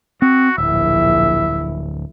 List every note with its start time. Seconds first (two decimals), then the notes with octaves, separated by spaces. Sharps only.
0.22 C4 F#4
0.58 D1 A#1 E4 E5